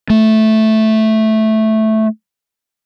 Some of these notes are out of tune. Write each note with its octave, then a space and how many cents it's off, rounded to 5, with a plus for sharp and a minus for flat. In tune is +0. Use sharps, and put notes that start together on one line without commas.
A3 -5